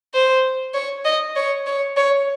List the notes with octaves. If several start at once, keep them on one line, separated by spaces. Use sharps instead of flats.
C5
C#5
D#5
C#5
C#5
C#5